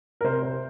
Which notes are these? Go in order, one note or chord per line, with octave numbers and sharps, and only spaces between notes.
A#4
C3 C5
C5